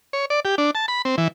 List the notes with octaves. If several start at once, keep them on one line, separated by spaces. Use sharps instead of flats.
C#5
D5
G4
D4
A5
B5
C4
E3